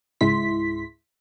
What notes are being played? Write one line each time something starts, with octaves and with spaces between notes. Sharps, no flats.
C#2 G#2 G#3 E4 C6 B6